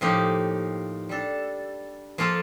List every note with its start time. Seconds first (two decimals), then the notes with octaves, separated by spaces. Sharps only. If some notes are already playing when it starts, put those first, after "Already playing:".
0.01 A2 F3 A#3 D#4 G4
1.09 G3 D4 A4
2.18 F3 A#3 F4 A4